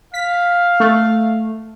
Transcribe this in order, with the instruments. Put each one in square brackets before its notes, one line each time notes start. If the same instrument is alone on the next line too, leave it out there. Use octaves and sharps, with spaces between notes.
[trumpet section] F5 [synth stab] B6
[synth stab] A3